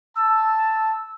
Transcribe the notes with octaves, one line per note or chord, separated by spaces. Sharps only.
A5 E6